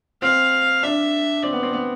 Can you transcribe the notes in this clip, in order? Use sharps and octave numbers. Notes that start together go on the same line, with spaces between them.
C4 F5
D4 E5
C4 D5
B3
C4
B3